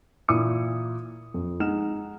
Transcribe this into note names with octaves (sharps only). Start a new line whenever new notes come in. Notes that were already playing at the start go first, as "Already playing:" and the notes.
A#2 E3 E4 D#6 C#7
F2
G#3 D#4 F#5 F6 E7